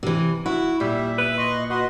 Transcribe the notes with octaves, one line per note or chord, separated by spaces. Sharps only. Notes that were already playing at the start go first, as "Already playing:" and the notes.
C3 E3
E4 F#4
A#2 G3 E5
B4
D#5 C6 C#6
F#4 B4 D#5 C6